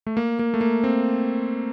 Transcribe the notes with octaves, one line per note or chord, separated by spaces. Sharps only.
A3
A#3
A#3
A3
A#3
C4